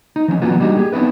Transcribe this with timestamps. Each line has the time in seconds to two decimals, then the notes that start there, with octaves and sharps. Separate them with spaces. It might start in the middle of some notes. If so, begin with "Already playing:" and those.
0.16 D#4
0.28 E3 F3 A3 C#4
0.42 E3 F#3 A#3 B3 F4 F#4
0.60 G3 A#3 D4 D#4 F#4 G4
0.77 G4 G#4
0.92 B3 C4 D#4 E4 B4